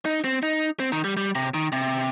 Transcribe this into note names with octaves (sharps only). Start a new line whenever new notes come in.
D#4
C4
D#4
C4
D#3
G3
G3
C3
D#3
C3